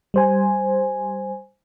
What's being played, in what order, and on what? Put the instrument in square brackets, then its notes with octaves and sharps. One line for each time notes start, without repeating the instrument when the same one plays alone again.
[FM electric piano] G3 C5 G#5